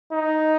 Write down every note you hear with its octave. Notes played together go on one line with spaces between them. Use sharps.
D#4